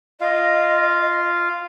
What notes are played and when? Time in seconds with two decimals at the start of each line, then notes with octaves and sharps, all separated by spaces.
0.21 F4 D#5 F5